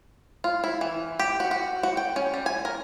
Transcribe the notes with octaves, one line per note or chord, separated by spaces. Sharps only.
F4
E4
E3
G4
F#4
F#4
F#4
G5
C#4
G3
G#5
A#4